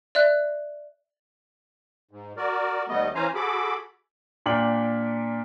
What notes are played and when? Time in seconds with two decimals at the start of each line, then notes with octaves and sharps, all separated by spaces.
0.15 D5 E5 F#6
2.11 G#2
2.37 F#4 A#4 D5
2.89 D#2 G3 A3 B3 D#5
3.15 E3 C#4 C5 F5 G#5 A#5
3.35 F#4 G#4 A4 B5 D6
4.46 A#2 D4 G5 F#7